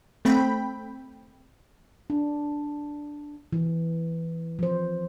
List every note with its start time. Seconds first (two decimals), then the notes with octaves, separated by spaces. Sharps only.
0.25 A3 C4 G5 B5
2.10 D4
3.52 E3
4.59 F3 C5